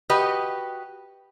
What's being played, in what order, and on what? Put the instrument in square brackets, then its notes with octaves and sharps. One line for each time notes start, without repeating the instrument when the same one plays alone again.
[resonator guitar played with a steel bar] F#4 G4 B4 D#5